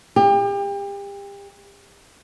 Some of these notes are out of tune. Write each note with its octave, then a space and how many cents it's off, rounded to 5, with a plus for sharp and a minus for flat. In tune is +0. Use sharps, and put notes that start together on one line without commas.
G4 +35